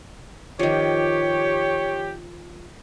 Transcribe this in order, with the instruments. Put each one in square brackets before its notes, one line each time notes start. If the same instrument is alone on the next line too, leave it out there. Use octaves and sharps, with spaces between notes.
[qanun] D#3 F3 [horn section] G4 [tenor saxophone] C#5